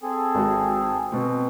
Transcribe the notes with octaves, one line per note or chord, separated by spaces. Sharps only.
C4 G#4 A4
G#1 F#4
B2 C4